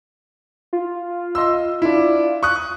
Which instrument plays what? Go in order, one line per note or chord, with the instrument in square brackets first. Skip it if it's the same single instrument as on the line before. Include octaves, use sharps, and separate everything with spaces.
[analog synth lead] F4
[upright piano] D#5 C6 E6
D4 E4
C#6 D#6 F#6